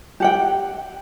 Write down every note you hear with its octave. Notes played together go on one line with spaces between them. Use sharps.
G4 F#5 G5